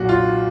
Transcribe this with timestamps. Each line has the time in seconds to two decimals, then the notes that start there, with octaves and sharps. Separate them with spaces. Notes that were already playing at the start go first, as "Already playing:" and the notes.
Already playing: B1 A#2 F#4
0.09 F4